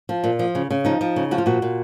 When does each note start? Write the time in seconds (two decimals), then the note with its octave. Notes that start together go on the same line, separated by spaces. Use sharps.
0.09 F3
0.24 A#2
0.39 F3
0.55 C#3
0.70 C#3
0.85 F3 D#4
1.01 F3
1.16 C#3
1.31 F3 F#4
1.38 F4
1.46 A#2 F#4
1.62 A#2